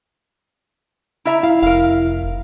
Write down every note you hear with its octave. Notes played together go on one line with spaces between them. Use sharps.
E4 E5 A#5
E4 F5
F1 A#4 F5